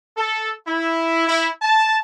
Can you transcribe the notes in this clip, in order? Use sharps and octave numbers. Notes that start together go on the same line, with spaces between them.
A4
E4
E4
A5